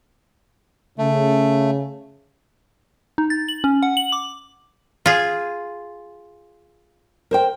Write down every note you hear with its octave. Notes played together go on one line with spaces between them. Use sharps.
C#3 A3
D#4
A6
F#7
C#4
F#5
F#7
D6
F4 G#4
A#4 C5 G5